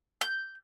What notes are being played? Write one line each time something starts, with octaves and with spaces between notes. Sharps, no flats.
G6